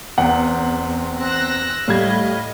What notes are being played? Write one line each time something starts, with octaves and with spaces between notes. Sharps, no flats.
E2 C4 F#5 G5
C4 E6 F#6 A#6
A2 G3 D#5 F5 G#6